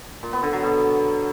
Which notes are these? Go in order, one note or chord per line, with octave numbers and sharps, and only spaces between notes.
A#2
B3
D3
F#3
B2